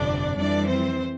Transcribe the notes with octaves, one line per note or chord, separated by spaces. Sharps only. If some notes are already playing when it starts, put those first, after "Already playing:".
Already playing: G1 F2 C3 D4 D5
F2 E3 G3 D4 D5
C4 C5